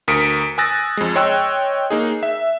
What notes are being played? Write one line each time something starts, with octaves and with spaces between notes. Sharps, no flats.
D2 A#4 D#6 B6 C#7 D7
G#5 D#6 E6 F#6 A6 A#6
F2 G#3
C#5 D#5 G5 C6 E6 F#6
A#3 D#4 G#4
E5